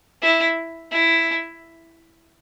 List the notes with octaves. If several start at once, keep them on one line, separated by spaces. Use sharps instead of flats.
E4
E4